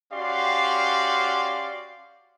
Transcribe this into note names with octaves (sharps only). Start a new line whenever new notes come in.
C#4 F#4 G4 D5 F5 C6